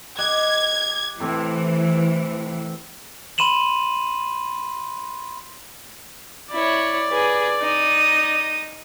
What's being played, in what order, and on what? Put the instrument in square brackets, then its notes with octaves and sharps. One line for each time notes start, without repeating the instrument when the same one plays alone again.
[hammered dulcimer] G4 D#5 F#5 [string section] G#6
[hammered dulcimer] A2 C3 C4 [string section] E3
[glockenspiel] B5 C6 D#7 E7 F#7
[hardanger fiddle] E4 C#5 [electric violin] D5
[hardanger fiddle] G#4 B4
D#4 D#6